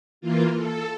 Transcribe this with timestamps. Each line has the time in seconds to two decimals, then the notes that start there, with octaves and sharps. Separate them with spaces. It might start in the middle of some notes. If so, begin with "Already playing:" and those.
0.21 E3 A#3 F4
0.56 A4